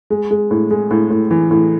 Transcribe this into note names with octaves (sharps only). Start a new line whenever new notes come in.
G#3
G#3
A2
G#3
A2
A2
E3
A2